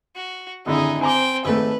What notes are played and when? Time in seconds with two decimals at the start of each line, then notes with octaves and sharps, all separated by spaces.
0.16 F#4
0.66 G#1 D3 D#4 E4 G#4
1.01 C4 G5 G#5 A#5 D6
1.45 G#1 A3 B4